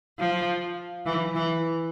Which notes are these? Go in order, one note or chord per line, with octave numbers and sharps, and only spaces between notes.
F3
E3
E3